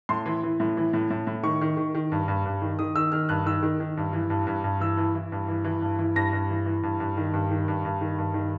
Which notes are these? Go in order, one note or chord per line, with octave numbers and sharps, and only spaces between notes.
A2 C6
E3
E3
A2
E3
A2
A2
A2
D#3 C#6
D#3
D#3
D#3
G2
G2
G2
D#3
D#3 D#6
D#3 E6
D#3 F6
G2 F#6
D#3 E6
D#3
D#3
G2
E3
G2
G2
G2
E3 E6
E3
E3
G2
E3
E3
G2
E3
G2 A#6
G2
E3
E3
G2
G2
D#3
G2
D#3
G2
G2
D#3
G2
D#3